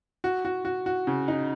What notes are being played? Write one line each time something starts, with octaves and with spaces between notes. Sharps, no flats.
F#4
F#4
F#4
F#4
C#3
D#4